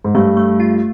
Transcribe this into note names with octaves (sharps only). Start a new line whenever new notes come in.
G#2
G2 A3
A3
F4